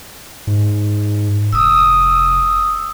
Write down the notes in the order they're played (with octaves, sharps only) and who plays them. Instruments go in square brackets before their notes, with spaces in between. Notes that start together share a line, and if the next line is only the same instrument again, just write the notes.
[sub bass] G#2
[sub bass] F1 [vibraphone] D#6 E6